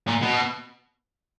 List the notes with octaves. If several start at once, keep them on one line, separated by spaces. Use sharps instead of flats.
A#2
B2